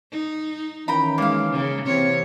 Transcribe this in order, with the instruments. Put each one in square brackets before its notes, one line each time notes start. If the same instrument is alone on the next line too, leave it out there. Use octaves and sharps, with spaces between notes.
[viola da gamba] D#4
[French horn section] D#3 E3 C#4 [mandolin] G5 A#5 B5
[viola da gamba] G#3 [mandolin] A#3 F5
[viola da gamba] C#3
[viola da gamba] C3 E3 C#5 [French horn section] C4